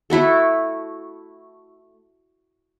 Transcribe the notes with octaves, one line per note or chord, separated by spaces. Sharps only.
A3 E4 F#4 A4